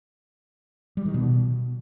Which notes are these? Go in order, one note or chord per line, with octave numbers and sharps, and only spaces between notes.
G3
D#3
B2